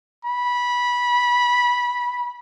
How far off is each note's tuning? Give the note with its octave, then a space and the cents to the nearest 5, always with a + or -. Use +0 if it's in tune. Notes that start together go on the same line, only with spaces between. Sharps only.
B5 -15